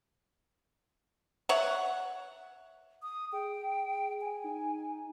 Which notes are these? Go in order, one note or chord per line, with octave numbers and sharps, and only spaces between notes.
C#5 E5 F#5
D#6
G#4 G5
G#5
D#4